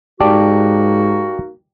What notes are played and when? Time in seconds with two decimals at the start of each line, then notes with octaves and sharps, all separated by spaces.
0.20 G#2 A#3 D#4 F#4 G4 D5 A5